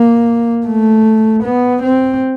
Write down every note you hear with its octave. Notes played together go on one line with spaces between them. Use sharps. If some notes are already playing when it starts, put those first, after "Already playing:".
Already playing: A#3
A3
B3
C4